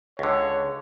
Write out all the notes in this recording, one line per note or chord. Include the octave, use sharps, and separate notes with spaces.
C#2 D3 C#5